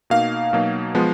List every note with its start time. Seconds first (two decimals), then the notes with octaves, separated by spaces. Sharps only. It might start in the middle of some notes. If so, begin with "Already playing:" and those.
0.10 B2 A#3 D#4 F5
0.53 B2 F#3 A#3 D#4
0.95 F3 G#3 B3